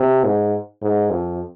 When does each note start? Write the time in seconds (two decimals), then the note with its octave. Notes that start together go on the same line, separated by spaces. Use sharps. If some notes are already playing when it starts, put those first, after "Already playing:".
Already playing: C3
0.25 G#2
0.82 G#2
1.11 F2